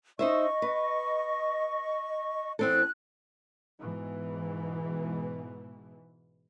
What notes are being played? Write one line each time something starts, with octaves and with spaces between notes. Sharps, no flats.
D#4 C5 D#5 E5 C#6
B4
E2 C4 A4 F#6
G#2 B2 E3